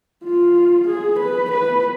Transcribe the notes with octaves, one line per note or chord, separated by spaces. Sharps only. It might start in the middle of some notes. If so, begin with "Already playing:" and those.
F4
G#4
B4
B4